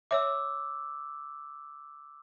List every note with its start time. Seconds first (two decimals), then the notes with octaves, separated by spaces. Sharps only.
0.11 C#5 E5 D6 E6